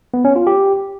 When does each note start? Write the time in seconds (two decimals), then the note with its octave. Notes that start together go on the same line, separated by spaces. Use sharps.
0.14 B3
0.25 C#4
0.36 F4
0.47 G4